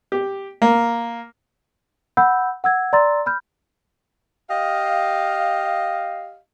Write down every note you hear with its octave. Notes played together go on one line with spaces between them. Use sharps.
G4
A#3
F#5 B5 E6 G6
F#5 E6 G#6
D5 A#5 C6 E6 A6
B5 F6 G6
G4 D#5 F5